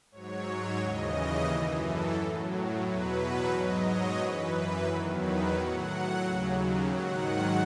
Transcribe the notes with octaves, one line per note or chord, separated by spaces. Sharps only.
G#2 F#3 C#5
C#5
D#2 C#3 E3 D#5
F#2 E3
A4
A2 F#3
E2 B2 F#3 B4
G#2 F#3 D#5
C#5
F#2 E3 B4
B4
E2 D#3 F#3
B4
A2 F#3 F#5
D#2 C#3 F#3
G#2 D#3 F#3 F#5